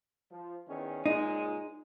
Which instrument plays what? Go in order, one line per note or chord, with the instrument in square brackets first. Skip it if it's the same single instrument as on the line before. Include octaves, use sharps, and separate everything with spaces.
[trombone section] F3
E2 D#3 C#4
[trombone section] C#2 A#2 G#3 [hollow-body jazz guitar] D#4